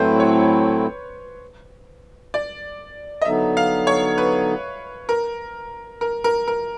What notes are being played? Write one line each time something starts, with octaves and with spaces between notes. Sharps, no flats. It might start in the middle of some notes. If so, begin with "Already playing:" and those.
Already playing: A2 F#3 A3 C4 E4 B4 C5
C#5
D5
D#5
D3 F#3 B3 D#4 E5
F5
C#5
B4
A#4
A#4
A#4
A#4